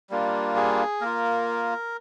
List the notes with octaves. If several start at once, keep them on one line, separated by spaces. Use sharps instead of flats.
G3 A#3 D4 F4
G#4
A#3 F4 A#4